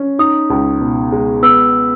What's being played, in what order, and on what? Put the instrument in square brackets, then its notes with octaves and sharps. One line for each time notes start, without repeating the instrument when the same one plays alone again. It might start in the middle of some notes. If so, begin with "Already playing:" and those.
Already playing: [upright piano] C#4
[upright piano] D#4 [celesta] D#6
[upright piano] C#2
B2
G#3
[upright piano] B3 [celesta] E6